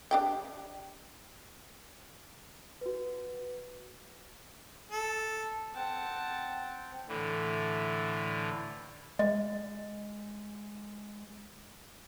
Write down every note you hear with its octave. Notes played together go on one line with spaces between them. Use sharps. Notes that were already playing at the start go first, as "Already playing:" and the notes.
D4 G4 G5
F#4 B4
A4
C4 F#5 G5 A5
A2 D3 E3
G#3 D#5